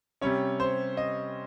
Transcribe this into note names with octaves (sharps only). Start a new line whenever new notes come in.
C3 G3 C#4 C#5
C5
D#5